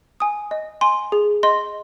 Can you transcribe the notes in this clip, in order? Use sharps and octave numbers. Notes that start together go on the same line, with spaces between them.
G#5 D#6
D#5
G#5 C6
G#4
D#5 C6